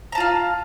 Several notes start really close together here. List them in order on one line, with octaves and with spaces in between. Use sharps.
A#5 A5 F4 F5